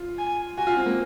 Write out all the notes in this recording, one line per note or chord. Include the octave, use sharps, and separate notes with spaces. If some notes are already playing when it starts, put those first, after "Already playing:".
Already playing: F4
G#5
F#4 G#5
F4
C4
A#3